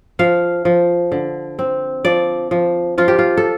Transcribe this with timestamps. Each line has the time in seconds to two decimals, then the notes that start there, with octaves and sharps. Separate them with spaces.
0.19 F3 F5
0.65 F3
1.12 D3
1.59 C4
2.05 F3 D5
2.51 F3
2.98 F3 F4
3.08 G4
3.19 F4
3.37 A4